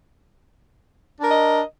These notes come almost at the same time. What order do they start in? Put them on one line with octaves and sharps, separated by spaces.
D4 A#4 D#5